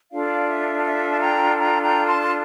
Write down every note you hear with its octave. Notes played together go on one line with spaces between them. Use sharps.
D4 F4 A4 D5 F5
E5
E5
A5
G5 A#5
G5 A#5
G5 A#5
A5 C6
C6